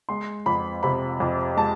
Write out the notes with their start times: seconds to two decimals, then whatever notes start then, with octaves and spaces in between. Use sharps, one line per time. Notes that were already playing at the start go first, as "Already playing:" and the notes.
0.09 G#3 C6
0.46 F2 B5
0.83 C3 B5
1.20 F2
1.57 G#3 A5